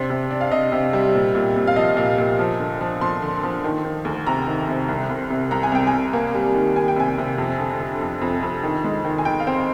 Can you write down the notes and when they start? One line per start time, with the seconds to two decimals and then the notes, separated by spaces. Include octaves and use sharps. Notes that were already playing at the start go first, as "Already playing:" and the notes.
Already playing: C3 D4 C5
0.10 C3
0.31 D4
0.41 F5
0.52 C3 D#5
0.72 C3
0.93 G3
1.15 A#2
1.35 A#2
1.56 A#2
1.67 F5
1.76 F3 D#5
1.97 A#2
2.18 A#2
2.39 F3
2.59 D3
2.81 F3
3.01 F3 C6
3.22 D3
3.43 F3
3.64 D#3
3.85 D#3
4.05 D2
4.27 C3 A#5
4.47 D#3
4.68 C3
4.89 C2
5.10 C2
5.30 C3
5.51 C2 A#5
5.63 G#5
5.72 C2 G5
5.87 G#5
5.93 C2
6.13 A#3
6.35 G3
6.55 D#3
6.76 D#3 G#5
6.88 G5
6.96 C3 G#5
7.18 C3
7.38 F2
7.59 D3
7.80 D3
8.01 F2
8.21 F2
8.43 F2
8.63 D#3
8.84 G#3
9.05 D#3
9.18 G#5
9.25 D#3 G5
9.40 F5
9.47 C4 G5